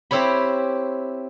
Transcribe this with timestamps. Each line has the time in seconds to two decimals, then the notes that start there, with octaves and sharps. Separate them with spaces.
0.11 C4 E4 G4 C#5 B5